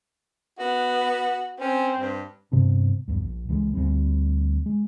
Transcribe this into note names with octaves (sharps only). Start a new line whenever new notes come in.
B3 F#4
C4 C#4
G2
G2 C3 B3 D4
B1 E2 G2
A#1
C#2 E3 G3 G#3
D2 G3 C4
G#3